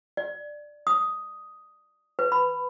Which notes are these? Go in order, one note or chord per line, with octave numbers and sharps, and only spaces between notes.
D5
D#6
B4
B5